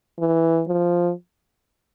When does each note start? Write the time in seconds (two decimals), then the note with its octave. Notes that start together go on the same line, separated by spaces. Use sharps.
0.19 E3
0.68 F3